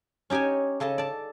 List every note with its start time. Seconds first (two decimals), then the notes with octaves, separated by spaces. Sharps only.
0.30 C#4 D#4 G4 C#5 G#5
0.80 C#3 A4 D#5 A5
0.98 D5 A5